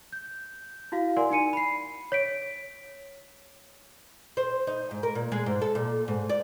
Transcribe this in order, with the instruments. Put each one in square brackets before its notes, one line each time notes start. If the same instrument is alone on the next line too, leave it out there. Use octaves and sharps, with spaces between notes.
[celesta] G6
E4 F#4 F5
A#4 D5 F#5 G#5 C6
D#4 G#5 C#7 D#7
B5 C7
C#5 B6 D7
[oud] C5
D#4
G#2
A#4
A#2
G#3
G#2
A4
A#2
G#2
D5